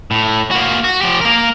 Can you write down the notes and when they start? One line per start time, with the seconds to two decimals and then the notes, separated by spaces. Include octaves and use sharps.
0.11 A2
0.51 A#3 F#4
0.84 F#4
1.01 F3 G4
1.21 A#3 A#4